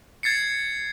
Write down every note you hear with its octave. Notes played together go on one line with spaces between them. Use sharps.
G#6 A6 C7 C#7